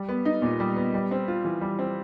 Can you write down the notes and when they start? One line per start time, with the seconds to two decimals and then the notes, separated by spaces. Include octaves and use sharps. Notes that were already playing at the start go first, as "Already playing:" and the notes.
Already playing: G3
0.09 B3
0.25 D#4
0.42 A#2
0.60 G3
0.76 B3
0.94 G3
1.11 C4
1.28 F4
1.45 E3
1.61 G3
1.79 C4